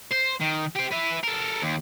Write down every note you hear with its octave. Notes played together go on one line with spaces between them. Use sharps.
C5
D#3
G4 C5
B4 E5
A4 A#4
D#2